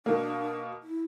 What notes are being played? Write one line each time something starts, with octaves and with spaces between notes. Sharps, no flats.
B2 A#3 D4
E4